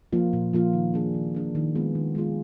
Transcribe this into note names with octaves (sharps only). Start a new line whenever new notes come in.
F3 A#3 F4
A#2
F3 A#3 F4
D#3
A#3 D4 G#4
D#3
A#3 D4 G#4
D#3
G#3 B3 F4 G#4
D#3
G#3 B3 F4 G#4